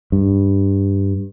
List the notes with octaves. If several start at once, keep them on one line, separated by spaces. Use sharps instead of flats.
G2